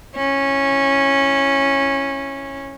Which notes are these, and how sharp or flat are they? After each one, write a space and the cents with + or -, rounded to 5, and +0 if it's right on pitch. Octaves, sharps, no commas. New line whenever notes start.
C#4 -15 E4 +0